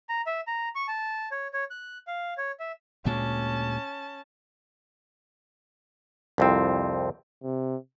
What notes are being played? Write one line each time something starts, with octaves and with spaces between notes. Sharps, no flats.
A#5
E5
A#5
C#6
A5
C#5
C#5
F#6
F5
C#5
E5
D2 A#2 G#3 C#4 A5
C2 F2 C4
C3